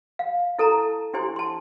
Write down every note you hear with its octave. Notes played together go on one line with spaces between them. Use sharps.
F5
E4 A4 A5 A#5
D4 E4 G4 C5 G#5 C6
A5 C6